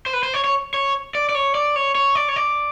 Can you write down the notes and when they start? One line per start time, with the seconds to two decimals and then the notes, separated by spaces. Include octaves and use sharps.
0.06 C5
0.13 B4
0.23 C5
0.34 C#5
0.44 C#5
0.74 C#5
1.15 D5
1.29 D5
1.35 C#5
1.55 D5
1.76 C#5
1.95 C#5
2.15 D5
2.29 C#5
2.36 D5